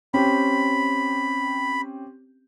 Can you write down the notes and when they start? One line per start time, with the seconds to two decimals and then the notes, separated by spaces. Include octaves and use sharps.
0.14 C4 C#4 G4 B5